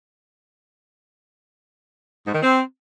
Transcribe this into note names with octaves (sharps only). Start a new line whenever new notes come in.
G#2
D#3
C4